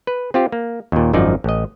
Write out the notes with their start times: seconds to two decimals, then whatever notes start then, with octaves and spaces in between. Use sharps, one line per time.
0.07 B4
0.34 C4 F4 G4
0.52 A#3
0.92 D#2 A#2
1.13 G#1 F#2 F3 D#4 D5
1.44 A1 D#5